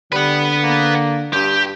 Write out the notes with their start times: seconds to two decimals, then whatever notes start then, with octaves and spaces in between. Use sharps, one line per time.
0.12 D3 G3 B4 F#5
0.63 A#3
1.33 G2 G4